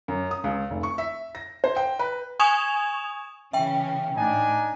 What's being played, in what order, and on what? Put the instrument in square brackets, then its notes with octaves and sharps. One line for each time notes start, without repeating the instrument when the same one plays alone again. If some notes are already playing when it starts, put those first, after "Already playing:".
[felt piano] F#2
D#6
C#2
F1
C#6
E5
A#6
C5
G5
B4
[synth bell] G#5 C#6 D#6 G#6 E7 F7
[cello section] C#3 E3 C#4 [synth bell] E5 G5
[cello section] A2 [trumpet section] D4 D#4 G#5